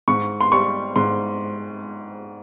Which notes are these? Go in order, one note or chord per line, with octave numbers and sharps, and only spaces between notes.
G#2 C#6
C6
G3 C#6
G#2 C6